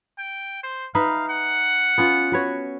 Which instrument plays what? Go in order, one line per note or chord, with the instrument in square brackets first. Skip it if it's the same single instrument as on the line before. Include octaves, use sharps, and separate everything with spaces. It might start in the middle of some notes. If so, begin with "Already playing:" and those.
[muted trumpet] G5
C5
[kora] D#4 B4 E5 [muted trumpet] F5
[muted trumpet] F#5
[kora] B3 C#4 F4
F#4 B4 C#5